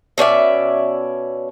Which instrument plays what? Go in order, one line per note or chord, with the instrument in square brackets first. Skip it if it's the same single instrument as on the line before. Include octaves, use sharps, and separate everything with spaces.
[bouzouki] B2 C#4 D5 E5